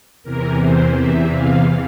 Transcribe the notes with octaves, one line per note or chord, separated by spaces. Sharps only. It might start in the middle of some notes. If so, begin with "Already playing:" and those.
E2 C3 E3 A#4
C5
E5
F5